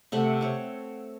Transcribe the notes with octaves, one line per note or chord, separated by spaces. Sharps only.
C3 A3 F#5
C4 C#5